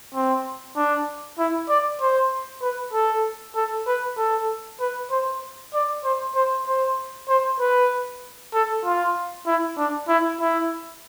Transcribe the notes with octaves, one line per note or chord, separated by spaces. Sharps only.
C4
D4
E4
D5
C5
B4
A4
A4
B4
A4
B4
C5
D5
C5
C5
C5
C5
B4
A4
F4
E4
D4
E4
E4